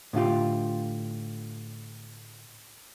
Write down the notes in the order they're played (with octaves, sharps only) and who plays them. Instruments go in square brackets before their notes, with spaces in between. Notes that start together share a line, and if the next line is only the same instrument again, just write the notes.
[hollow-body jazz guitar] A2 D3 F4 G4